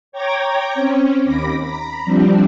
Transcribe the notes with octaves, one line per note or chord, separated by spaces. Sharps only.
C#5 G5 A#5 D6 G#6 A#6
C4 C#4
D#2 B5 D6 A#6
A#5 B5
F3 G3 C4 D4